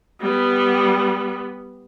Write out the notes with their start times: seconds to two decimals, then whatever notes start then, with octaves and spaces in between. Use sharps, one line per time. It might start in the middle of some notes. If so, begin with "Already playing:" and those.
0.20 G3 B3